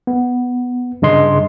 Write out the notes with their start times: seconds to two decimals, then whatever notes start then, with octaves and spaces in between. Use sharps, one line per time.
0.07 B3
1.02 G2 C#3 D#5 C6